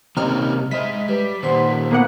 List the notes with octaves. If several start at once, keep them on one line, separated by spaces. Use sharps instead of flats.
C3 G3 A#3 C#4 D#4 F6
G#3 C5 D#5 E5 B5 B6
G3 B4
A#2 D#3 G3 C5 F#5 C6
A#3 B3 F#5